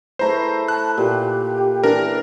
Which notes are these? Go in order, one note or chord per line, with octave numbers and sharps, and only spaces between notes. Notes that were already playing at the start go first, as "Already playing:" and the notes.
A3 E4 B4 C5 A#5
A5 F#6
A#2 G4
E3 D4 A#4